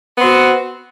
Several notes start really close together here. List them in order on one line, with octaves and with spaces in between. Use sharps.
B3 C4 F#4